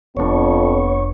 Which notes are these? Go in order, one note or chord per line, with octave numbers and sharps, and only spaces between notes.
F1 F2 G#2 B3 D4 C#5